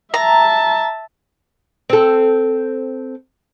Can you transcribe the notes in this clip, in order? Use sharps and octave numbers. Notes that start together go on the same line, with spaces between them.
E5 A5 A#5
C4 A4